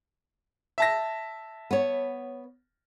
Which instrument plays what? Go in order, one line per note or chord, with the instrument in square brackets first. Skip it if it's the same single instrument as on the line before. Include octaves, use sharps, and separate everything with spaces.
[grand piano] E5 A5 A#6
[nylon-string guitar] B3 C#5